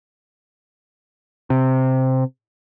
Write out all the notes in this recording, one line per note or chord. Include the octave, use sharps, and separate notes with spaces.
C3